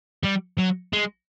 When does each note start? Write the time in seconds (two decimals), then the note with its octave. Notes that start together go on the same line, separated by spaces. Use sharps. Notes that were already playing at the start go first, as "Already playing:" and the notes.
0.23 G3
0.58 F#3
0.93 G#3